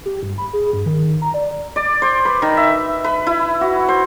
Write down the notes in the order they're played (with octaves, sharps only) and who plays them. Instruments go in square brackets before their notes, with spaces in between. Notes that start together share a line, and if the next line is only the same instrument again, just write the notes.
[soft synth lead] G4
G2
B5
G#4
G2
D#3
D#3
A#5
D5
[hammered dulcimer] D5
C5
B4
D#3
E5
B4
E4
F#4
C5